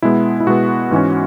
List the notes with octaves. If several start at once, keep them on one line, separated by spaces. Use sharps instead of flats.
B2 G#3 B3 E4
E4
B2 G#3 B3 F#4
G#2 E3 G#3 C#4